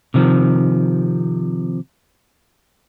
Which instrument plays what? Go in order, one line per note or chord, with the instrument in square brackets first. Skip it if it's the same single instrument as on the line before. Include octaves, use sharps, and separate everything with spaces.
[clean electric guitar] C3 D#3 F3